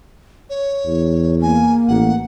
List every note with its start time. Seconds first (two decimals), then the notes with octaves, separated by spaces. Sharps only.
0.50 C#5
0.86 E2
1.41 A#3 G#5
1.88 A1 F#5